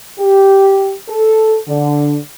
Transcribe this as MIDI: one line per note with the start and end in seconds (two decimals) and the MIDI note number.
0.19 0.94 67
1.09 1.58 69
1.68 2.17 50